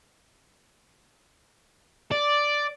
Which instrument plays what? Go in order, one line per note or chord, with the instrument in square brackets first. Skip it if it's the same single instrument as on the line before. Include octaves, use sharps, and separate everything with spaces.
[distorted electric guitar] D5